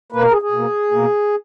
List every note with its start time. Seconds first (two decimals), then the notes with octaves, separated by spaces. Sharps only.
0.12 B2 A#3 B4
0.22 A#4
0.31 G#4
0.42 G#4
0.51 B2 A#3
0.91 B2 A#3